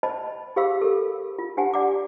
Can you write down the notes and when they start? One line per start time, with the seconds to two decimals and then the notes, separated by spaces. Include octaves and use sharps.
0.03 C5 D#5 A5 B5
0.56 G4 G#4 C5 F5 B5 E6
0.82 A4 A#4
1.39 F4
1.57 D4 G4 C5 F#5 G#5 A5
1.74 D5 F#5 A#5 D6